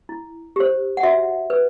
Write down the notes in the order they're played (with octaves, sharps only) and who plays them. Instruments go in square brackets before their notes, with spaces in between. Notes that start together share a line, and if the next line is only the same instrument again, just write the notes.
[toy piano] E4
G4 C5
F#5
F#4 E5
B4